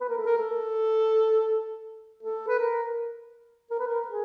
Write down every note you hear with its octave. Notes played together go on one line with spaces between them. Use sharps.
B4
A#4
A4
A#4
A4
A4
B4
A#4
A#4
B4
A#4
G#4